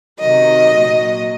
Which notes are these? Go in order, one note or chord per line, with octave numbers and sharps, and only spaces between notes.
C3 D#3 F#3 D#5
A#2 F#3